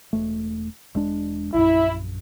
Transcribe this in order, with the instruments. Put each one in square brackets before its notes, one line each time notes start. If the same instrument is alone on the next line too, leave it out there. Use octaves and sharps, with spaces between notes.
[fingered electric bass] E1 A3
E1 G#3 D4
[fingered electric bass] A#1 F#2 [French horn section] E4